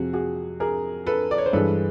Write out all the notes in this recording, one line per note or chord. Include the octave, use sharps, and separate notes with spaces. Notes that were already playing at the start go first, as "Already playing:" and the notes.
Already playing: F2 C3 F3 F#4 G#4
F#4 G#4
G#4 A#4
A4 B4
D5
C#5
C5
G2 E3 G#3 A4 B4